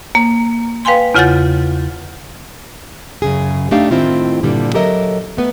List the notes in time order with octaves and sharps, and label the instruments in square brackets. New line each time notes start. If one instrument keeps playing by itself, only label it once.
[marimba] A#3
B4 F5 G5 G#5 C6
E2 C#3 F4 F#5 G6 A6
[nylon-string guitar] F#2 C#3 G#4
A3 D4 D#4 G4 F5
A2 D#3 C4 E4 F4
G2 A#2 D3 G3
F#3 G4 A4 A#4 D#5 E5
A3 B3 B4